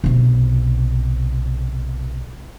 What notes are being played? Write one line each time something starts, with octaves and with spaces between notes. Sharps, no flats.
B1 C3